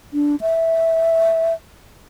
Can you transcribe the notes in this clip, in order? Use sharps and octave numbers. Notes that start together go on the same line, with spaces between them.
D4
E5